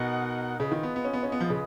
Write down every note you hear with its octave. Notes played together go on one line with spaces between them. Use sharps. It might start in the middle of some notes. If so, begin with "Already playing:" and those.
Already playing: B2 D#4 A#4 D#5 F#5
C#3 F4 G#4 B4 D#5
D#3
B3
B3
C#4
B3
C#4
B3
F3
C#3